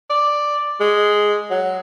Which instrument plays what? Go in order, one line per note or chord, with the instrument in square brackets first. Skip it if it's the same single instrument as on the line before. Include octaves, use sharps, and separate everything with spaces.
[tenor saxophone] D5
G#3
F#3